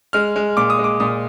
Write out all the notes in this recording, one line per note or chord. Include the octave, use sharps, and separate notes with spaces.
G#3 F6
G#3
A#2 D6
D#6
G#3
D6
A#2 D#6